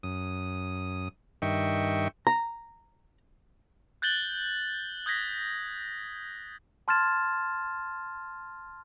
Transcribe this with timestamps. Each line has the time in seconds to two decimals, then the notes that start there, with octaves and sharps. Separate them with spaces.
0.03 F#2 D#6
1.42 G2 D#3 D#5 E5 G5 C#6
2.27 A#5
4.02 F#6 G6 A6 F#7 G7
5.06 D#6 G6 G#6 A#6 B6
6.88 A5 C6 F6 G#6 A6 E7